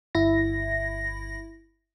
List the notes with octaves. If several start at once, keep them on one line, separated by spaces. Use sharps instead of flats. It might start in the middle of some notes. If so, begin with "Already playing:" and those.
G1 E4 A#6